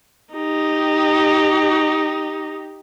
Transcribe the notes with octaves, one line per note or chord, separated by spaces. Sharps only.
D#4 G4